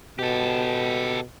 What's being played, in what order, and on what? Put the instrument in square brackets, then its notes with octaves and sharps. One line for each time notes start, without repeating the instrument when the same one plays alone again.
[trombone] B2 [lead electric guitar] G4 A4